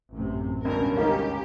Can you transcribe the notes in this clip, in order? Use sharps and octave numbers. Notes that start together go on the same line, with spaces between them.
A1 F#2 C3
C#2 G2 B2 D3 C#4 A#4
D#4 G4 A#4 F5